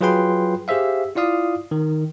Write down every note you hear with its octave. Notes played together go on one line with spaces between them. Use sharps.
F#3 F4 G#4 B4 G5 C6
G4 G#4 C5 E5 F5
E4 F4 D5 F5 D#6
D#3